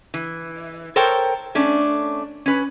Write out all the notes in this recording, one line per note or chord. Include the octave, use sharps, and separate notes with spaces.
E3
A4 A#4 C5 C#5 G5
A3 C#4 D4
C#4 B4